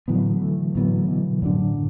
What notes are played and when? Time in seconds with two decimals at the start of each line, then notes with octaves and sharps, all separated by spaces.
0.08 A2 D3 E3 F#3 B3
0.42 E3 A3
0.75 A2 D3 E3 F#3 B3
1.08 B2 E3
1.42 F#2 A2 D3 F#3 D4